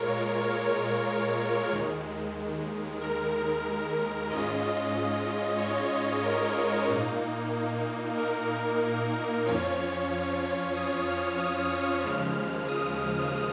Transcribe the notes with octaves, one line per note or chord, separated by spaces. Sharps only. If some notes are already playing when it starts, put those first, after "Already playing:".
Already playing: A#2 G#3 F4 A#4 C#5
C#5
D#2 D#3 G#3
A#4
G#2 G#3 C#4 F4 D#5
C#5
D#5
A#4
A#2 A#3 D#4
A#4
F2 F3 C#4 F4 C#5
D#6
F6
D#6
D#2 C#3 F3 G#3 F6
D#6